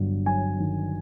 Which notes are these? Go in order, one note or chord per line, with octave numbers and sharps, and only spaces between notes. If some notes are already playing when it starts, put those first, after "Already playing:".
Already playing: G1 G2 F#3
F#3 G#5
D#3